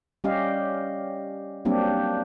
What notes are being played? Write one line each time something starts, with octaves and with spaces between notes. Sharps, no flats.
G3 C#4 G4 D#5 F5
F#3 G3 A#3 C4 D4 G4